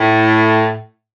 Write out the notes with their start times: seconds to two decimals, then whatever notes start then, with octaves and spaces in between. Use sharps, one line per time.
0.01 A2